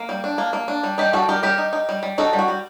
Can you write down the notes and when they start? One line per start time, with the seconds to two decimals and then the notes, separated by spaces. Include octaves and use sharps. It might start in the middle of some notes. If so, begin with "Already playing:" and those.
Already playing: A#3
0.09 G3
0.24 D4
0.38 A#3
0.53 A#3
0.68 D4
0.83 G3
0.98 G3 D#4 G4
1.13 G3 F#4 A4
1.29 G3 G4 A#4
1.43 G3 G4 A#4
1.58 D#4
1.73 D#4
1.89 G3
2.03 G3
2.18 D#4 F#4 A4
2.33 G3
2.39 F#4
2.48 G3